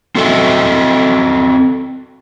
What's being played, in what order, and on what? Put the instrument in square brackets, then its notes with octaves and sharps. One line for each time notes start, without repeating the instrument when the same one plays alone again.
[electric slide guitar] C4 F#4 A4 D#5 E5